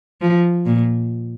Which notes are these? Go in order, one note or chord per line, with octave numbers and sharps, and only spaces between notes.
F3
A#2